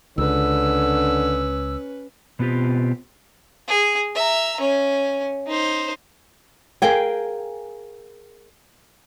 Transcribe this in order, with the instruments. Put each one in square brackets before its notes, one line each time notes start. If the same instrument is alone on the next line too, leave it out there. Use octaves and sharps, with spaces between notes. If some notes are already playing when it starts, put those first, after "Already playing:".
[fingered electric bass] C#2 [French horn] D3 [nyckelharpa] C#4 B4 [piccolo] E6
[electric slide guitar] B2 B3 C4 F4 G4
[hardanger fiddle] G#4
E5 A#5
C#4
D#4 C5
[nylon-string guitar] G#4 A#4 F5 G5 G#5